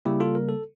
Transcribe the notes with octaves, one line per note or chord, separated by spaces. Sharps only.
C#3 G3 A#3 E4 G4
F4 A4
A#4
A4